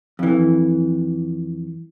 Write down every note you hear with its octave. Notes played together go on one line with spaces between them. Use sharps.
F2 E3